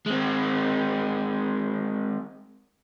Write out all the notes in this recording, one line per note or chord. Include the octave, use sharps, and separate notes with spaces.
G#3 C4